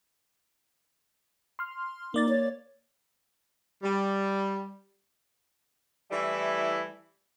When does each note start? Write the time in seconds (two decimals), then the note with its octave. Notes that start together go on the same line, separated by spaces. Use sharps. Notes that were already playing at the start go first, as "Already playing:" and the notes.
1.59 C6 F6
2.14 A#3 D#4 D5 A6
2.29 C#5
3.82 G3
6.11 E3 G3 A3 E4